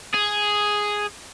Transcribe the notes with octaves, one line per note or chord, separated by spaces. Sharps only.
G#4